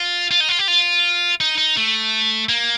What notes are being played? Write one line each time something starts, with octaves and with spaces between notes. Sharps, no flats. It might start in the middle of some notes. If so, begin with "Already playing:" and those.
Already playing: F4
F4
D#4
F4
G4
F4
D#4
D#4
A3
A#3